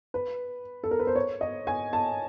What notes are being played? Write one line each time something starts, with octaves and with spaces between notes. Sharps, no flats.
B4
A4
A#4
B4
C5
C#5
D#5
G#5
A5